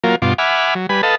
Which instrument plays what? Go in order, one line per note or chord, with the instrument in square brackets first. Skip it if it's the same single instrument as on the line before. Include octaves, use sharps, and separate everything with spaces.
[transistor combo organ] F#3 A#3 F4 A#4
G2 B2 F4 C6 D6
E5 F#5 G#5 B5 D6 F6
F#3
G3 B4 G#5 B5
A4 B4 D#5 F5 A5